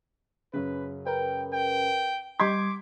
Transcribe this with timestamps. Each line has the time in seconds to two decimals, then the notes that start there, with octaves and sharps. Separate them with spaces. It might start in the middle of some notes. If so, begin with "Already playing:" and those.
0.53 F#2 C#3 B4
1.07 A#4 B4 G5
1.53 G5
2.39 G3 D#5 C6 D6 G6 G#6 B6